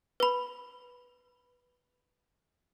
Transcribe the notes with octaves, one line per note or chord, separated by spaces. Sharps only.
B4 B5